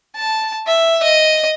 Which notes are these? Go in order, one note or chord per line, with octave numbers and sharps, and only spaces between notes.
A5
E5
D#5